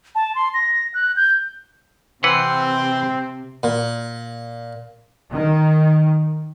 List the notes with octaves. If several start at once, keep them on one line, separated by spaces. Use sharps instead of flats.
A5
C6
A#6
F#6
G6
C3 E3 C4 B4 F#5 C6
A#2
D#3